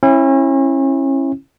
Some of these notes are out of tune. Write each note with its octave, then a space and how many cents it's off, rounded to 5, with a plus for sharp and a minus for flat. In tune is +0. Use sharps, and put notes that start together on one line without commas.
C#4 -35 E4 +0